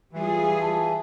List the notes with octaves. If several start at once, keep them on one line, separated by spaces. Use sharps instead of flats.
E3 G3 F4 G#4
A5